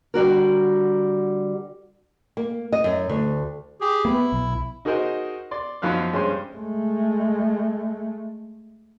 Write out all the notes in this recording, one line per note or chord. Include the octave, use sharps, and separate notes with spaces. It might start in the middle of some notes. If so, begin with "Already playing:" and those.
D3 G3 F#4 A#4
A#3
D#5
F#2
D2
G4 G#4
A#3 B3 E4
B1
D#4 F#4 G#4 A#4 C5 D#5
D5 C6
F#2 F3 D#4 F5 F#6
G2 G#3 C#4 C5 C6
G#3 A3